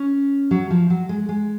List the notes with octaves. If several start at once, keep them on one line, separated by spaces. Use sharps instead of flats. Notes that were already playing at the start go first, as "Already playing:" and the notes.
Already playing: C#4
F#3
F3
F#3
G#3
G#3